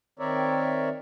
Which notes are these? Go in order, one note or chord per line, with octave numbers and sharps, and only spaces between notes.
D#3 C4 A#4 C#5 D5 E5